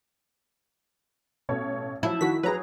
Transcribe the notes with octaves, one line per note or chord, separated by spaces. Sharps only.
A1 B2 A4 C#5
F3 F#3 E4
D#3 F#4 B6
F#3 G#4 B4 A#5